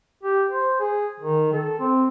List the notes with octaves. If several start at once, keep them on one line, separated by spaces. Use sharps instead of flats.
G4
C5
G#4
D#3
A4
C4